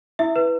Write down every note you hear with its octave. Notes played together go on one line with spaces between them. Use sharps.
E4 E5
B4